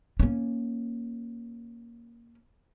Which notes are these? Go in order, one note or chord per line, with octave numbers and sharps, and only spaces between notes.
A#3 C#4